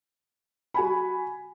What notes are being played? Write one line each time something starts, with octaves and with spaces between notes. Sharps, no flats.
F#4 G#5 B5